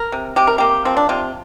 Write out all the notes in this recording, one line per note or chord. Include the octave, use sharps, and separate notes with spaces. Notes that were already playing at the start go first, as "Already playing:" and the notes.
Already playing: A#4
C3
C3 G4
A#4
A#3 G4
F3 C4
D4
C3 F4